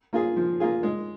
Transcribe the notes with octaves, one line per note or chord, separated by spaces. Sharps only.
A#3 F4 G#4
F3
A#3 F4 G#4
G#3